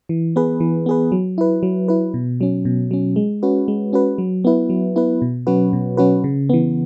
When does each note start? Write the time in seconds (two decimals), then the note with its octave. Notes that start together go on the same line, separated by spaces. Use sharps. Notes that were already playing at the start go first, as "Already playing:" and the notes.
0.09 E3
0.36 B3 G#4 B4
0.60 E3
0.86 B3 G#4 B4
1.12 F#3
1.38 E4 B4
1.63 F#3
1.88 E4 B4
2.14 B2
2.41 F#3 C#4
2.65 B2
2.91 F#3 C#4
3.16 G#3
3.43 C#4 F#4 B4
3.68 G#3
3.93 C#4 F#4 B4
4.18 F#3
4.44 B3 E4 B4
4.69 F#3
4.96 B3 E4 B4
5.22 B2
5.47 F#3 C#4 F#4 B4
5.73 B2
5.97 F#3 C#4 F#4 B4
6.24 C#3
6.49 E3 B3